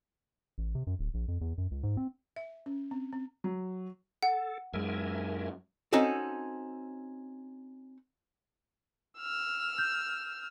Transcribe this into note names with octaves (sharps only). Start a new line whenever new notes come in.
A1
C3
F#2
D1
A#1
F2
E2
F#2
C#2
G#2
C4
E5
C#4
C4
C4
F#3
A4 F#5
F#2 G#3 A#4 E5 G#5
C4 C#4 D#4 F#4 A4
E6 F6
G6